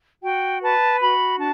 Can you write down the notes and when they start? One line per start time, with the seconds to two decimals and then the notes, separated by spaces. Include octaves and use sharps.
0.23 F#4 G5
0.61 B4 A5
1.00 F#4 B5
1.38 D4 A5